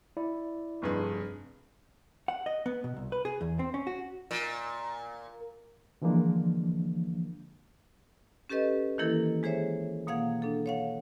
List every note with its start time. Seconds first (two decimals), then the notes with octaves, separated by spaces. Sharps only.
0.17 E4 D5
0.82 F1 G2 G#4
2.28 F#5
2.46 D#5
2.66 B3
2.84 B2
2.97 C2
3.12 B4
3.25 G#4
3.41 E2
3.59 C4
3.74 C#4
3.87 F#4
4.31 A#2
6.02 D3 E3 F3 G#3 A#3 D4
8.49 C#4 G4 A4 B4 D#5
8.98 D#3 E3 A#3 E4 A4 A#4
9.43 G#3 G#4 C5 C#5 E5
10.07 B2 A#3 F5 F#5 G#6
10.42 D4 A4
10.66 C#5 F5 F#5